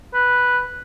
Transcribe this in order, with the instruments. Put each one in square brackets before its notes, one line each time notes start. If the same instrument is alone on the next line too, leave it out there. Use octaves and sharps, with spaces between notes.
[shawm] B4